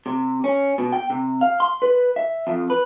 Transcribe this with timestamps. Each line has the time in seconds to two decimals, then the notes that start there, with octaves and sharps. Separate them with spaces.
0.06 C3
0.44 C#4
0.78 B2
0.93 G5
1.10 C3
1.41 F5
1.60 C6
1.82 B4
2.16 E5
2.47 F2
2.70 B4